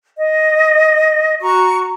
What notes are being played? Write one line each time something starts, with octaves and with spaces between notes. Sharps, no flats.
D#5
F#4 A#5 C#6